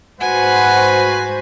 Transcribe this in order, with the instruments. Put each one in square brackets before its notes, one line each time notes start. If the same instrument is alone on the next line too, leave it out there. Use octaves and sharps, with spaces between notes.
[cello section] G#2 F#4 C5 [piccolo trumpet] B4 [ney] F#5 [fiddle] G#5